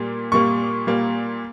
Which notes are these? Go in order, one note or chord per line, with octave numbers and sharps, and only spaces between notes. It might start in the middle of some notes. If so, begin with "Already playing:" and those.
Already playing: A#2 G3 A#3
A#2 G3 A#3 C#6
A#2 G3 A#3